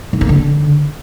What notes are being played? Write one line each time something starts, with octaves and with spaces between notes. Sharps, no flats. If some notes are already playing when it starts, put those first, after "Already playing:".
G#2
A#3
D3